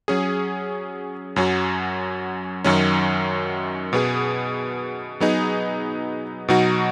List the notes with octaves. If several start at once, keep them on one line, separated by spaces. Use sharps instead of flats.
F#3 C#4 G#4
F#2 F#3 C#4 F#4
F#2 D#3 F#3 C#4
B2 B3 G#4
F#3 B3 D#4 G#4
B2 F#3 D#4 F#4